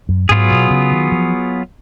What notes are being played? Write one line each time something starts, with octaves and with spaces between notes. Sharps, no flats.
F#2
G#2 F#3 B3 F4 G#4
B2
C#3
D#3
F3